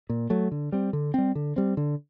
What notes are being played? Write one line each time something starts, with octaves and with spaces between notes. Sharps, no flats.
A#2
F#3 A3
D3
G3 C4
D3
G3 C4
D3
G3 C4
D3